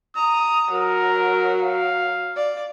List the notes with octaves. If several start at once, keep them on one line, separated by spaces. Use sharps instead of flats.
A#5 D#6
F#3 A#4
F5
D5